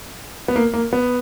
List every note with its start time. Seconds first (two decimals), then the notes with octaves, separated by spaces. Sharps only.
0.48 B3
0.56 A#3
0.74 A#3
0.93 B3